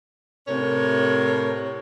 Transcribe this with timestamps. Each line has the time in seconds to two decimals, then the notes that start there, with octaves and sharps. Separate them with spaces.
0.47 A2 C3 A#4 C#5